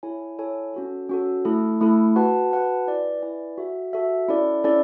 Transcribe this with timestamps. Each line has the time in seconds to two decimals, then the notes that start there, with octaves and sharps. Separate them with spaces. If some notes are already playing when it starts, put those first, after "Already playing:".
0.03 E4 A4 C#5 G#5
0.38 E4 A4 C#5 G#5
0.74 C#4 F#4 A4
1.09 C#4 F#4 A4
1.45 A3 E4 A4
1.81 A3 E4 A4
2.16 F#4 B4 F#5 A5
2.51 F#4 B4 F#5 A5
2.87 E4 B4 D5 G#5
3.22 E4 B4 D5 G#5
3.58 F#4 A4 E5
3.93 F#4 A4 E5
4.28 C#4 E4 A4 D5
4.64 C#4 E4 A4 D5